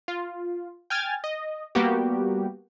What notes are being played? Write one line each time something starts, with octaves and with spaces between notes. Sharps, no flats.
F4
G5 G#5 F6 G#6 A6
D#5
G3 A#3 B3 F#4 G4